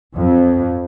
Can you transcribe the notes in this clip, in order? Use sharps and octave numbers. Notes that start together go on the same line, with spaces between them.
F2